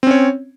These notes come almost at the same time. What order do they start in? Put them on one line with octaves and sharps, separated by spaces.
C4 C#4 C#5